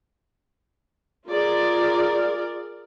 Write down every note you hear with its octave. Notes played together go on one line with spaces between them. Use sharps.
F4 G#4 A#4 D5